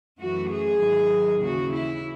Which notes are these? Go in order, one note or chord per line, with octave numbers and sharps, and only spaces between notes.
F#2 E3 A3 F#4
G#4
G#2 D#3 F#3
D#2 C#3 E3 F#4
E4